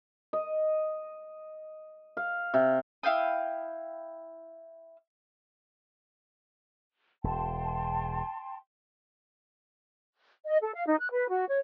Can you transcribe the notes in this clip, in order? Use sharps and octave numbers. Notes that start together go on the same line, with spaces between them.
D#5
F5
C3
E4 F5 G5 D#6
E1 G5 A5 C6
D#5
A4
F5
D#4
F#6
B4
F#4
C#5